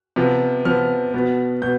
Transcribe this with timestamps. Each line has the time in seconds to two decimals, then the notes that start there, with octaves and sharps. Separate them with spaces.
0.16 C3 F3 B3
0.65 C3 F3 B3 F6
1.14 B2 B3
1.62 B2 B3 G6